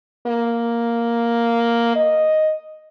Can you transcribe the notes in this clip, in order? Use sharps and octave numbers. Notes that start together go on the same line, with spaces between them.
A#3
D#5